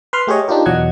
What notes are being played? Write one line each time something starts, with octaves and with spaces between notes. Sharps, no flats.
B4 B5 C6 F6
A3 G4 G#4 C#5 D#5
D4 D#4 F4 G4 A#4
E2 B2 F#3 D#5 F#5 G#6